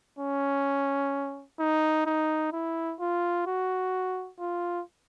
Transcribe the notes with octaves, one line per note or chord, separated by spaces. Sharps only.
C#4
D#4
D#4
E4
F4
F#4
F4